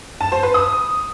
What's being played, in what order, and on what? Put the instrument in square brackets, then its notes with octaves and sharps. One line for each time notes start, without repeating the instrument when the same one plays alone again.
[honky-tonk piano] A5
C5
B4
D#6